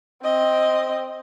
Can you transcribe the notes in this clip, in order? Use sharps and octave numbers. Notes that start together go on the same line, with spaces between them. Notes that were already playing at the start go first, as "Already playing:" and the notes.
C4 D#5